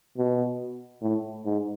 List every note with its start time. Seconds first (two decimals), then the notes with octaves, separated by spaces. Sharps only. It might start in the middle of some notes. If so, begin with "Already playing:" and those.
0.17 B2
1.02 A2
1.44 G#2